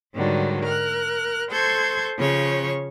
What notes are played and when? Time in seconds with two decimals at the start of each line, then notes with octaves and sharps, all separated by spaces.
0.14 G#2 D3 D#3 F#3 G3
0.63 A#4 F6 F#6
1.51 A4 C5 C6 C#6 G6 G#6
2.17 C#3 F3 C#5 C#6